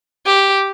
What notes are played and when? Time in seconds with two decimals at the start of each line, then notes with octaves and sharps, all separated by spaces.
0.26 G4